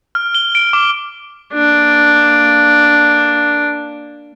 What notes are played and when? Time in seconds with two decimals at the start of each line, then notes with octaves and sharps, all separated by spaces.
0.15 F6
0.35 G7
0.55 D7
0.73 D6
1.53 A#3 D4